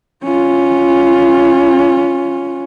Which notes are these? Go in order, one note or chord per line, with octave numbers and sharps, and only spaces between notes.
C#4 F4